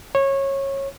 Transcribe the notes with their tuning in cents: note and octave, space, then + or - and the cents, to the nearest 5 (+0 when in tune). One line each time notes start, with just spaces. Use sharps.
C#5 -20